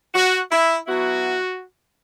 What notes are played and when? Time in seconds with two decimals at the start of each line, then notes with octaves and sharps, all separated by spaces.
0.14 F#4
0.51 E4
0.87 F#3 B3 E4 F#4